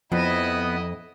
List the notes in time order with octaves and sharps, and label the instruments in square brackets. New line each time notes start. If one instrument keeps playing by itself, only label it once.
[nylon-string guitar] F2 [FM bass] F3 [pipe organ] B3 [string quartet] E4 D#5